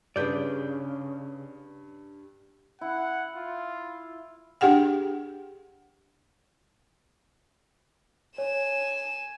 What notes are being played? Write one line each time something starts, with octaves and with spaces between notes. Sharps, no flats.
G2 C#3 G#4 B4 D5 G6
E4 F#5
F4
D4 G4 G#4 F#5 G5
C#5 G#5 E7